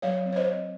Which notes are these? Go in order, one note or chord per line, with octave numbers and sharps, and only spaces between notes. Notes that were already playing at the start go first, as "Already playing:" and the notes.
F#3 C#5 F5
C4
C#5
C5 D#5
C4